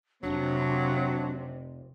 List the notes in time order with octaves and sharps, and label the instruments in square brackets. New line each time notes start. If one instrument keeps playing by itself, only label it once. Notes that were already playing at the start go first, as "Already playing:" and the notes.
[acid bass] F1 [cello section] C3 [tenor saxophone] F#3 [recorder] D4